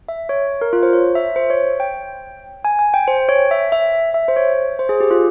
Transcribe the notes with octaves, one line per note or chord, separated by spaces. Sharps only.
E5
C#5
A#4
F4
C5
C#5
E5
C5
C#5
G5
G#5
G#5
G5
C5
C#5
E5
E5
E5
C5
C#5
C5
G#4
G4
F4